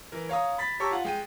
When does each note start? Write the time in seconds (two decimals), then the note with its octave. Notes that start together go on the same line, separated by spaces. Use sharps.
0.12 E3 A#4
0.29 C#5 F5 A#5 D#6
0.58 B5 A6 B6
0.80 G4 C#5 A5 A#5 C#6 E6
0.91 F4 F5 F#5
1.05 G#3 G5 D#7